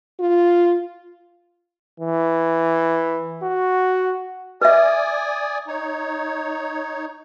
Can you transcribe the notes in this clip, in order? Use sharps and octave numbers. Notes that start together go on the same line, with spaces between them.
F4
E3
F#4
B4 D5 E5 G#5 D#6
D#4 C#5